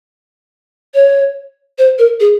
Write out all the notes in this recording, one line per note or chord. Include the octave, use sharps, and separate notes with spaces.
C#5
C5
A#4
G#4